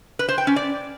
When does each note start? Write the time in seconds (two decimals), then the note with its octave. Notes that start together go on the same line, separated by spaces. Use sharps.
0.19 B4
0.29 C5
0.38 G5
0.47 C#4
0.56 D5